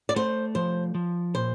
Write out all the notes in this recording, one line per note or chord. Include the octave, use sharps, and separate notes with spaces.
D5
A3 C5
F3 C5
F3
A#2 C5